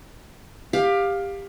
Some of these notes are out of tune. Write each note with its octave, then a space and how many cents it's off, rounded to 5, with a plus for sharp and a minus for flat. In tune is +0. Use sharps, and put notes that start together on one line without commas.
G4 +20 F5 +15